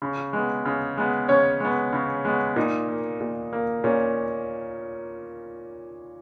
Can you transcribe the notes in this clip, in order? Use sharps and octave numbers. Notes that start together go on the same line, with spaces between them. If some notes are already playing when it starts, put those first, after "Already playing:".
C#3
G#3 B3
C#3
G#3 B3
C#3 C#4 C#5
G#3 B3
C#3
G#3 B3
A#2 D#4
A#3
A#2
A#3
A#2 C#4